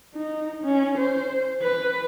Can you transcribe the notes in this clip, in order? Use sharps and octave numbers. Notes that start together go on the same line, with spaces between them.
D#4
C#4
C5
B4